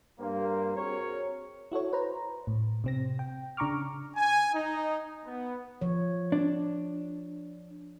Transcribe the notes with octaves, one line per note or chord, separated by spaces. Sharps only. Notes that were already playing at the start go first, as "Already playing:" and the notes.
G2 A#3 C5
C4 F#4 G#4 A#4 C#5
E4 F#4 A4 C#5
B4 C5 A#5
A2
C3 C4 A#6
G5
C#3 D4 A#5 C#6 D6 F6
G#5
D#4
B3
F3 C#5
D4